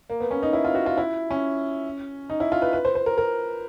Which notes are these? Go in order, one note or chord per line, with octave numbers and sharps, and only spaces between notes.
A#3
B3
C#4
D#4
E4
F4
F#4
F4
E4
C#4
D#4
E4
F4
B4
B4
C5
C5
A#4
A#4